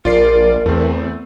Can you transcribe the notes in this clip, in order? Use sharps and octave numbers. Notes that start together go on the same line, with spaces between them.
A#1 F4 A#4 D5 C7
E2 A3 C4